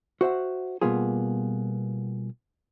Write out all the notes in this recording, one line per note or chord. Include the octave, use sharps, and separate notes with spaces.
F#4 C5 E5 F#5
B2 G3 A#3 B3 F4 G#4